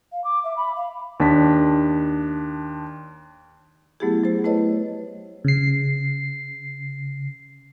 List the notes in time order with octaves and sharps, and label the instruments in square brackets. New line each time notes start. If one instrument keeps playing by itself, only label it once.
[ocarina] F5
D6
E5
B5
F5
[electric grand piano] D#2 D4 B6
[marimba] F#3 A3 B3 E4 G4 G#4
F#3 C5
A3 E4 B4 C#5 D#5
[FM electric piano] C#3 C7